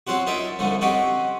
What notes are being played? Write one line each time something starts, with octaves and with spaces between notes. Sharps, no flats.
F#3 C4 C#4 F4 F#4
C#4 D#4 A#4 E5 A5
C2 F2 D3 F3 A3
C4 C#4 D#4 F#4 G4